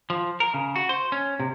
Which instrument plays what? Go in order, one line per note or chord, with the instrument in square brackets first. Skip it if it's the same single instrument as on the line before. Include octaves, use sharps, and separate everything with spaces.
[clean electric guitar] F3
A#4
C#3
F#4
C5
C#4
C3